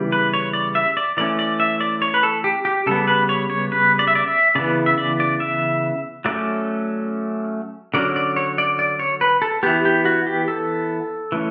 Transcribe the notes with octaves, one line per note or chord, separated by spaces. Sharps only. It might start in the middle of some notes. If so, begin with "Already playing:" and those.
Already playing: C#3 E3 G3 B3
B4
C#5
D5
E5
D5
E3 A3 C#4 D5
D5
E5
D5
C#5
B4
A4
G4
G4
C#3 G3 B3 A4
B4
C#5
C#5
B4
D5
E5
D5
E5
C#3 E3 B3 D5
E5
D5
D5
E5
F#3 A3 C#4 D5
D3 F#3 C#4 D5
D5
C#5
D5
D5
C#5
B4
A4
E3 B3 G4
G4
F#4
G4
A4
E3 A3 C#4